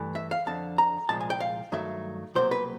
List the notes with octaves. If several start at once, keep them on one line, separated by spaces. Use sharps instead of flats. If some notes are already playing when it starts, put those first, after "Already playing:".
Already playing: G2 E3 A3
E5
F5
F2 D3 F3 A5
A#5
C2 A#2 F3 G#3 A5
G#5
G5
F5
G2 D#3 F#3 A3 E5
C2 B2 F#3 A#3 C5
B4